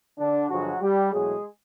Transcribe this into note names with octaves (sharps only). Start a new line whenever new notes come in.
D3 D4
G2 D3 F3 F#3 G#3 F#4
G3 G4
E2 B2 F#3 G#3 A3 G#4